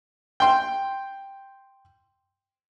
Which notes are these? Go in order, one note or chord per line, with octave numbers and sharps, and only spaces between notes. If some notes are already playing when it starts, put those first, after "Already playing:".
G5 C6